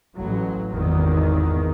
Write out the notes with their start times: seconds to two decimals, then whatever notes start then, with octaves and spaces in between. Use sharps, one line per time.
0.17 A1 F#3
0.72 G#1 E2 D#3